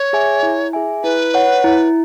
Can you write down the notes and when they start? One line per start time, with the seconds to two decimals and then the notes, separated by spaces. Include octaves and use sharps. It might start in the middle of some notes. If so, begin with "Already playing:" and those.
Already playing: C#5
0.13 G#4 E5 G#5
0.43 E4
0.73 G#4 E5 G#5
1.03 E4 B4
1.34 C#5 F#5
1.64 E4